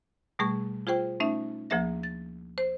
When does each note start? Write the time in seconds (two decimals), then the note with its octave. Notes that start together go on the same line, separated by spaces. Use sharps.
0.39 B2 G3 A3 G#4 C#6
0.87 F4 G#4 C5 G5
1.20 A3 C#4 D#4 E5
1.70 D2 F3 A#3 G#4 E5 A#6
2.03 A6
2.58 C5